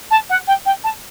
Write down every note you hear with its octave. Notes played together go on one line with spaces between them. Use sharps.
A5
F#5
G5
G5
A5